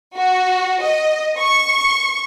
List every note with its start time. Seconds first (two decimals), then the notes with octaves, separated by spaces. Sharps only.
0.17 F#4
0.82 D#5
1.38 C#6